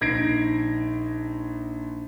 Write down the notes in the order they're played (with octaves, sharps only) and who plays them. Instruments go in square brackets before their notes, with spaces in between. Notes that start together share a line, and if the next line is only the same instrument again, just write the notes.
[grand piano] A#1 D#4 G#6 A#6 C7 D7